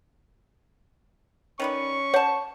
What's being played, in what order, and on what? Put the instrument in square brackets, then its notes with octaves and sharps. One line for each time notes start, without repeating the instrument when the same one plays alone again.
[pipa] D#3 B4 D5 [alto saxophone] C#4 [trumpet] C#6
[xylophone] C#5 [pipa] F#5 A5